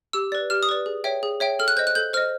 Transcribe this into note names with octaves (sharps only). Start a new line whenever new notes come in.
G4 E6
B4 D5
G4 F6
D#6
B4 D5
G#4
C#5 E5 G5
G#4
C#5 E5 G5
A4 F6
F#6
C5 D#5 G6
F#6
A4 G6
C5 D#5 F6